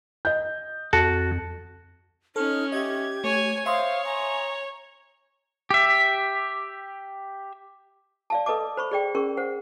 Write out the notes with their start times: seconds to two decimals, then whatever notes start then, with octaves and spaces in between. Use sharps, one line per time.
0.25 D#5 G6
0.93 F2 F#4 A4
2.36 C#4 D#4 A4 F6
2.72 G4 D#5 E5 G#6
3.24 A3 C#5 G#5
3.66 C5 C#5 E5 F5 C6 D#6
4.05 G#5 A#5
5.71 G4 E5
8.30 D5 F5 A5
8.46 A4 B4 D#5 A5 D6
8.77 C5 B5 C#6
8.91 G#4 D5 G5
9.15 C#4 G#4 A#4 C#6
9.37 C5 F#5